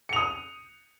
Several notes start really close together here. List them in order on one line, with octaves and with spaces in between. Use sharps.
C#7 F7 D#6